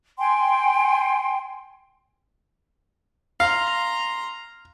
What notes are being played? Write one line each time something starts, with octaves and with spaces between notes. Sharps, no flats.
G5 G#5 C6
F5 A#5 C6